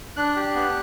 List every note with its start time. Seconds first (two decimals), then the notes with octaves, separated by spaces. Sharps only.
0.16 D4 F#6
0.36 G4
0.54 B3